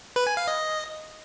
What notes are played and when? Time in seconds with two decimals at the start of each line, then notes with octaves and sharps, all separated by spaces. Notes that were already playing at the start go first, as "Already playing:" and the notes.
0.16 B4
0.27 G#5
0.37 F5
0.47 D#5